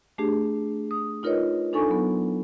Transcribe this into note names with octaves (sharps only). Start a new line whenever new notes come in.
A3 D4 G4 G#4
D#6
D#4 F4 A#4 B4 C#5 D#5
D4 D#4 A4 G#5 C#6
F#3 B3